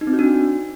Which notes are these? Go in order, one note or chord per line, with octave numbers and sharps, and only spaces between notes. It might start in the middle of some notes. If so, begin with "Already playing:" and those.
D#4
C4
F#4
D4